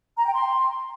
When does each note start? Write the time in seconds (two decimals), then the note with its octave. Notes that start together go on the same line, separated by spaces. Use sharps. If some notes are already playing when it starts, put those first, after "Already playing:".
0.16 A#5
0.25 G5
0.33 C6